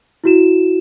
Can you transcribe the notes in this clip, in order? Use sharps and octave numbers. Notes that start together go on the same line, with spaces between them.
E4 F#4 E7